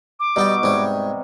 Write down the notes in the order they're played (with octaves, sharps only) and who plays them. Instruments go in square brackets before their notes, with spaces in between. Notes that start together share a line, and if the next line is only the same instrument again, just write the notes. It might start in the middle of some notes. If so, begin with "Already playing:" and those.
[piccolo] D6
[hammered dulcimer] B2 D#4 F#4 [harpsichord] G3 G4 D5
[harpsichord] G#2 C#5 [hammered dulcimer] C3 G3